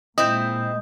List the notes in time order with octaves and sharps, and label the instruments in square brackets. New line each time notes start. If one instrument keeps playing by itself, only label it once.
[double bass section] A#2 G#3 [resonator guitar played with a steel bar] C4 E4 [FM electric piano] D#5 [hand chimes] D#6 G6